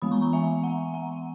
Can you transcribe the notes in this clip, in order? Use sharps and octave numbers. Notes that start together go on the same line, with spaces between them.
E3 G#3 B3 B5 D#6
A#5 C#6
A#5 C#6
E5 G#5
F#5 A#5
F#5 A#5